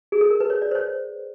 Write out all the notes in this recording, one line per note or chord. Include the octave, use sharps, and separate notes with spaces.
G#4
A4
A#4
B4
C#5
D5
C5
C#5